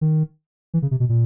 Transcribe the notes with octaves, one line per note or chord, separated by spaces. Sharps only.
D#3
E3
C#3
C3
B2
A#2